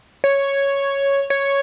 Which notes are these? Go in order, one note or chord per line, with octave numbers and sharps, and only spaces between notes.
C#5
C#5